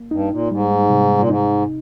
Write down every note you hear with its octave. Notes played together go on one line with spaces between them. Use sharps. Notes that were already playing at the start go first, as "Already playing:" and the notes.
Already playing: A#3
G2 D#4
A#2
G#2 G3
C3
A#2
G#2 D#4